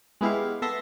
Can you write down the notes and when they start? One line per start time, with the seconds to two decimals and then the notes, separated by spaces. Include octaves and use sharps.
0.21 G#3 B3 E4 G4 F5
0.62 B3 A4 E5 C6 A#6